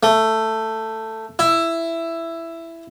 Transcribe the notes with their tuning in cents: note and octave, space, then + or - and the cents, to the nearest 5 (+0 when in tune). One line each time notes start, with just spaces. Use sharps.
A3 +10
E4 +10